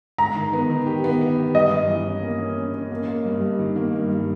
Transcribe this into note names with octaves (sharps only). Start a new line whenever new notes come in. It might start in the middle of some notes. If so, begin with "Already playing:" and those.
G#3 A#5
D#3
B3
D#3
G4
B3
B3
G4
G2 D#5
G2
E3
C#4
A#3
C#4
C#4
C#4
A#3
A#3
G2
G2
D#3
A#3
G2
G2